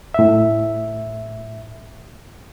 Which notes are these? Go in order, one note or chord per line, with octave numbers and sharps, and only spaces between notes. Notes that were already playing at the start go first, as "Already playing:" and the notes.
A2 E5